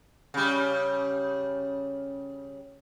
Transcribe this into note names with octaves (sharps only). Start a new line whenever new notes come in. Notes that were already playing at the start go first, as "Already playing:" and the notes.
C#3 G3